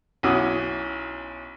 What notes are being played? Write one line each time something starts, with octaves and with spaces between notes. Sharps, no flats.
B1 C#4 E4 F#4 D6 D#6